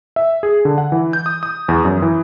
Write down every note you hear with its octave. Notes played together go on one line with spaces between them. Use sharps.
E5
G#4
D3
F#5
E3
G6
D#6
D#6
E2
F#2
E3